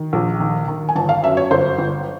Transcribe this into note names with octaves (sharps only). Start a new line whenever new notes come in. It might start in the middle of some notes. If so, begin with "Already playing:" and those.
Already playing: D#3
A#1
D#3
D#3
G#5
G1 A5
F5
F#2 E5
C#5
G1 C5
G1